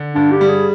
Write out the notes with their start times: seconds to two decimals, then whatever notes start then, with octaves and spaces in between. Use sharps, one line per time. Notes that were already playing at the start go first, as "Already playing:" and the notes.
Already playing: D3
0.15 G2 D4
0.32 G4
0.41 G3
0.49 G#4